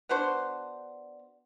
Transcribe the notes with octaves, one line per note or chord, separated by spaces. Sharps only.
B3 D4 F#4 C5